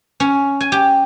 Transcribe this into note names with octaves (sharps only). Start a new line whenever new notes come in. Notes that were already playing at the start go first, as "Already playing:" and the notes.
C#4
G#5
G4